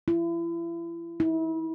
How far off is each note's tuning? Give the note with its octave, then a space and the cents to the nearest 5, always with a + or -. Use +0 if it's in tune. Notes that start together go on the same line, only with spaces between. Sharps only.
E4 +35
E4 -35